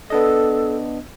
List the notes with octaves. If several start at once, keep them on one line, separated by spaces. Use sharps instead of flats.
B3 D4 A4 D#5